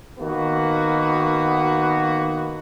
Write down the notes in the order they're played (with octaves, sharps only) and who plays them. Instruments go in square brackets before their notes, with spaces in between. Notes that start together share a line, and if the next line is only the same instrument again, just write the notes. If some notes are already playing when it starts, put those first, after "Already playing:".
[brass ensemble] D#3 A#3 B3 F#4